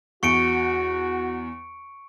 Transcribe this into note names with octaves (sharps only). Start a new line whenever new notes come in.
E2 F#4 C#6 C#7 D7